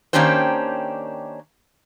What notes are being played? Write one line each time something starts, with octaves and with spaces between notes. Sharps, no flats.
D#3 A#3 C#4 D4 G4 C5